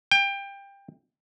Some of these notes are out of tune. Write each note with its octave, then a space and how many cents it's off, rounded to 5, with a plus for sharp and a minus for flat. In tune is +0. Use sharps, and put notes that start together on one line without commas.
G5 +20